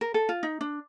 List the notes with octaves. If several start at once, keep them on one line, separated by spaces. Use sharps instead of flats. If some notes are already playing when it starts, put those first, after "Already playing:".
A#4
A4
F4
D#4
D4